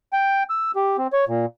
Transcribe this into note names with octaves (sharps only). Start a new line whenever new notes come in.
G5
E6
G4
C4
C#5
A#2